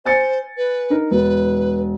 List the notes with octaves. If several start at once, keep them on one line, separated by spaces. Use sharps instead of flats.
C5 G#5 A6 C#7
B4
D#4 A#4
E1 B4